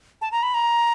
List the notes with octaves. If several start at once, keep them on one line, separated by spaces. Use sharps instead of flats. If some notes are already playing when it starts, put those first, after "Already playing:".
A5
A#5
B5
A#5